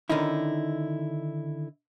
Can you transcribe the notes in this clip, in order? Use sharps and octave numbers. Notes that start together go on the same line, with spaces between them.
D3 D#3 C#4 D#4 E4